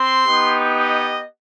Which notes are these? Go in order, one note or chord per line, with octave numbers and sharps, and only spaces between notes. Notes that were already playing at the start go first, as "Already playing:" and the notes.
Already playing: C4 C6
B3 D#4 G4
D#5